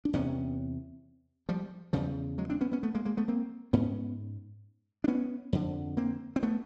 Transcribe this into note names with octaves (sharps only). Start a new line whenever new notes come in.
D4
E2 C3 B3 C#4
F3 G3
E2 C#3 F3 G3
F#3 G#3
C4 D4
B3 C#4
B3 C#4
A3 B3
G#3 A#3
G#3 A#3
A3 B3
A#3 C4
G#2 B3 C#4
D4
B3 C#4
F2 D3
A#3 C4
C4
A3 B3